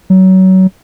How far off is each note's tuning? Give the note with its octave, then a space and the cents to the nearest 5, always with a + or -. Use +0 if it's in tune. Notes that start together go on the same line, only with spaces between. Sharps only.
F#3 +25